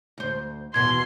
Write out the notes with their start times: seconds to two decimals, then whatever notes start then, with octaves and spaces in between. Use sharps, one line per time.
0.18 D2 C5
0.74 D#2 B2 E3 C6 G#6